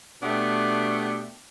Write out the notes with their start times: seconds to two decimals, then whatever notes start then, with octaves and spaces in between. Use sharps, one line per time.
0.23 B2 A3 B3 D4 G4